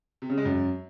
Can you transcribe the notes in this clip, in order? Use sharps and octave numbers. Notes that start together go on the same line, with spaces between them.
C3
C#3
G#3
F#2